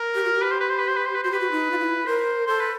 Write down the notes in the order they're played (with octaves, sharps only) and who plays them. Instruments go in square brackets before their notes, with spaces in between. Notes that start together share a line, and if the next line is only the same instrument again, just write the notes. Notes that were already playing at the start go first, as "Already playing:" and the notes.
Already playing: [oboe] A#4
[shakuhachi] G4
F#4
G4
[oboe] B4
C5
B4
C5
B4
C5
B4
C5
B4
[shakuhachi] F#4 [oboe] C5
[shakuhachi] G4 [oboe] B4
[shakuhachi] F#4
D#4
F4
E4
[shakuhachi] A#4 [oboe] C5
[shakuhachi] A4 [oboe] C5
[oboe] B4